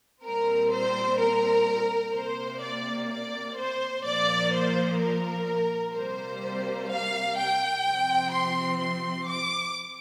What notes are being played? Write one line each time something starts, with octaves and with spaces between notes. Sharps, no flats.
A#2 G3 C4 A#4
C5
A#4
C3 A#3 C5
D5
D5
C5
A#2 F3 A#3 D5
C5
A#4
C3 G3 A#3 C5
F5
G5
C3 F3 C4
C6
C6
D6